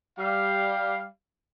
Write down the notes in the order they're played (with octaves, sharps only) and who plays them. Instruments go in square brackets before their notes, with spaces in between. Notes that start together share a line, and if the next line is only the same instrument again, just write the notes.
[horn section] G3 F5